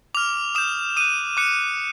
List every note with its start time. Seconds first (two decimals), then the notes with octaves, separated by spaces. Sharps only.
0.14 D6 F6 F7
0.55 D#6 G6 E7
0.96 D#6 F#6 D#7
1.37 D6 F#6 C#7